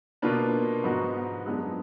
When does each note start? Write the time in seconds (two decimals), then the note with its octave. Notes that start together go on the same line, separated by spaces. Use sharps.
0.22 B2 A#3 D4 F4 B4
0.84 G#2 F3 B3 D#4 F#4
1.46 F#2 F3 G#3 B3 D4